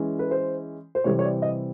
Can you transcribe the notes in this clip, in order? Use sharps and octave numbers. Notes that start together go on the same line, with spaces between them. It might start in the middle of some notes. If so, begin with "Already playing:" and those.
Already playing: E3 G#3 C#4
B4
C5
C5
C3 E3 G3 C4 C#5
C#5
D5
D#5